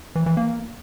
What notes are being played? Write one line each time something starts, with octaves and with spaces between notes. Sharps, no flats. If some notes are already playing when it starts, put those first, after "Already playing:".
E3
E3
A#3